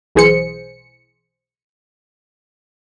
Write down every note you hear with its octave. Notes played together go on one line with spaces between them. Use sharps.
B1 E3 G#4 C5 C#7